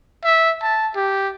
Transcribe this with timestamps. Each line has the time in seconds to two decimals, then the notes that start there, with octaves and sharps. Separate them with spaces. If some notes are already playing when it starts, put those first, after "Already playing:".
0.25 E5
0.62 A5
0.96 G4